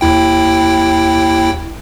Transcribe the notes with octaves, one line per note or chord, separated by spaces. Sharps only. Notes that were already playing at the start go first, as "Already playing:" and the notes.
D#2 E4 G5